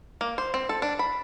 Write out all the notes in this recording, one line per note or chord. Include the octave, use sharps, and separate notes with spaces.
A#3
C5
C4
A4
D4
B5